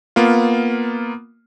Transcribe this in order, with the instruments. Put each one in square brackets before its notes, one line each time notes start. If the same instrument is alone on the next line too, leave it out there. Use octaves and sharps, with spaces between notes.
[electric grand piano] A#3 B3 F4